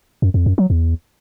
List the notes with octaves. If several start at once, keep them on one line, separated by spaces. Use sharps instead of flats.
F#2
F2
F#2
F#3
E2